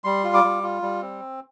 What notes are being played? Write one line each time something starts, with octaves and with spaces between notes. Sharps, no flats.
G3 C6
F4
D6
G3
F4
G3
C4